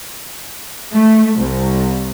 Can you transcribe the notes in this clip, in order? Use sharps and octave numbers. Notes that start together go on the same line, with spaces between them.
A3
C2